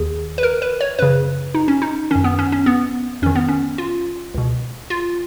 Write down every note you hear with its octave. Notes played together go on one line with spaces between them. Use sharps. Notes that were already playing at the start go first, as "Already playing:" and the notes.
Already playing: D#2 D#3 G#4
B4
A#4
B4
C#5
F#2 C#3 B4
D#4
C#4
D#4
F#2 D#3 C#4
B3
C#4
C#4
B3
F2 D#3 C#4
B3
C#4
F4
C#2 B2
F4